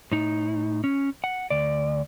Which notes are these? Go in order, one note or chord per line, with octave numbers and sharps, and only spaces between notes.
A2 D#4
C#4
F#5
D2 D5